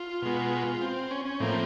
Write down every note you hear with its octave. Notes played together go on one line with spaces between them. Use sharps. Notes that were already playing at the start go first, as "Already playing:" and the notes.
Already playing: F4
B2 G#3 B3
C4
C#4
C#4
A2 F3 A#3 C4